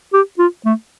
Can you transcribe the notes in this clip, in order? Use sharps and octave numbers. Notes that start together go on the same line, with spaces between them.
G4
F4
A3